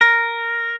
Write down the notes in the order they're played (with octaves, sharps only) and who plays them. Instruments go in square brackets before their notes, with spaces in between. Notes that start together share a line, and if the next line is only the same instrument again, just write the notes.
[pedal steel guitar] A#4